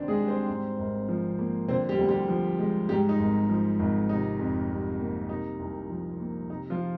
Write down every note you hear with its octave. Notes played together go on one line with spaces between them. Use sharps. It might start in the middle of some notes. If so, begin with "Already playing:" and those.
Already playing: D2 C3 D#3 C4 D4 C5 D5
G#3 G#4
G3
C4 C5
G#2
G#1
F3
A#3
D3 C4 C5
G3 G4
D2
G3 G4
F3
G#3
G#2 G3 G4
D#4
G#1
F3
G#1
C3 D#4
F2
G3
A#3
C3 D#4
C2
F3
A#3
C3 D#4
F3 F4